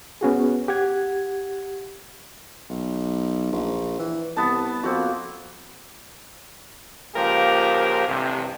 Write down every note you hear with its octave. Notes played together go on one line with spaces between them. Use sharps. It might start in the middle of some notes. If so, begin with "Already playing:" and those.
B3 C#4 F#4 G#4
G4 F#5 G#6
B1
A#1
E3
C2 B3 A5
F2 A#3 C4 F#4
C#2 F3 A#3 G4 A#4
A1 G2 C3